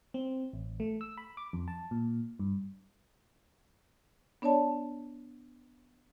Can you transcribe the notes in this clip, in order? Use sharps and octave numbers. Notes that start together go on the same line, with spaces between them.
C4
A1
A3
E6
B5
D6
F2
A5
A#2
G2
B3 D4 C#5 D5 A5